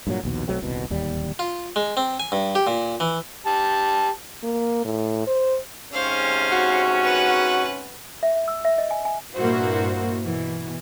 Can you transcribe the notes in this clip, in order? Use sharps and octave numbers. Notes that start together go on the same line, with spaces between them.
G2 A#2 F#3
A#1 D#2 B2
B1 F#3 A3 C4
D#1 C2 B2
D1 D#2 G3
F4
G#3
C4
G#5
G2
G4
A#2
E3
G4 A5
A#3
A2
C5
G#2 C3 C#4 C5 F5
F#4
B4 F#5
E5
E5
E6
E5
D#5
G#5
G#5
G2 A#2 A#3 E4 F#4 C5
B2 E3